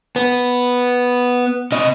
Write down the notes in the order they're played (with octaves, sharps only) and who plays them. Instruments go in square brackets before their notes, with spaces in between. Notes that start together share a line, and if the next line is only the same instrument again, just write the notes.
[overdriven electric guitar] B3
C3 D#5